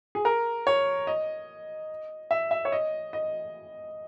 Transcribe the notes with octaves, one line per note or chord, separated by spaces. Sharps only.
G#4
A#4
C#5
D#5
E5
E5
C#5
D#5
D#5